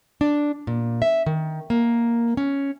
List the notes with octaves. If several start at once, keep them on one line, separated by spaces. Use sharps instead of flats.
D4
A#2
E5
D#3
A#3
C#4